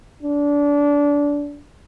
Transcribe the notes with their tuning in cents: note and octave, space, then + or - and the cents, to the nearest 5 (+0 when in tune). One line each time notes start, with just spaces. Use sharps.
D4 -25